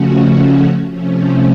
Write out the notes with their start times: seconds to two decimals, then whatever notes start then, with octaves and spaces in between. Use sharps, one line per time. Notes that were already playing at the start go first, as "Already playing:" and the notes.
Already playing: C#3 F3 A3 C#4 F#4
0.89 C3 F3 A3 C#4